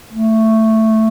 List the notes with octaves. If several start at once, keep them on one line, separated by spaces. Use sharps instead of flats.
A3